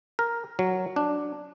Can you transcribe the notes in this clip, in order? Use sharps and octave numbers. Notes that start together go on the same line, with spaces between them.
A#4
F#3
D4